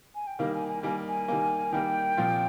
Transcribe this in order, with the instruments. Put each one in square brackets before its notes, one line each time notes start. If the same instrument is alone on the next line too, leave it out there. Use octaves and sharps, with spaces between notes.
[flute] G#5
G5
[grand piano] D#3 G3 A#3 [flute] F5
[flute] G#5
G#5
[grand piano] D#3 G3 A#3 [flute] G#5
[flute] G#5
[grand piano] D#3 G3 A#3
[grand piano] D#3 G3 A#3 [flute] G5
[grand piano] A#2 F3 C4 F4